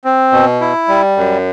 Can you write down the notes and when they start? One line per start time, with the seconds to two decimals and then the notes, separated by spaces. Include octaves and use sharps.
0.05 C4
0.32 B2
0.61 E4
0.88 G3
1.17 F#2